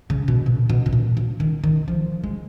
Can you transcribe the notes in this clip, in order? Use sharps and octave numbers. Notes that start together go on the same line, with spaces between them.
C#3
B2
A#2
B2
B2
A#2
C#3
D#3
D#3
F3
G#3